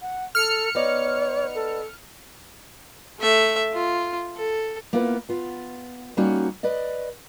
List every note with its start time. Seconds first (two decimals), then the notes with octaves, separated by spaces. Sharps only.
0.02 F#5
0.35 A4 F6 C#7
0.75 B3 D#4 C#5 D5
1.55 A4
3.20 A3 E5
3.73 F4
4.36 A4
4.93 A#3 B3 E4 F4 B4
5.29 B3 F4
6.17 G3 A#3 C#4 D#4 F#4
6.63 B4 D5 D#5